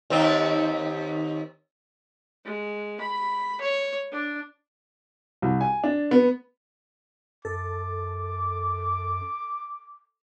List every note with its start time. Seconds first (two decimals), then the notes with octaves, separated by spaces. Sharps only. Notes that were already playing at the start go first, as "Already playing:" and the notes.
0.10 D#2 C4 D#4
2.45 G#3
3.00 B5
3.61 C#5
4.11 D4
5.42 C2
5.61 G#5
5.84 D4
6.11 B3
7.45 F#2 A4 D6